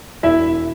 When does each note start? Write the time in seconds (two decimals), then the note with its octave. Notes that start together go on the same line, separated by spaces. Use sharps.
0.23 E1 E4 E5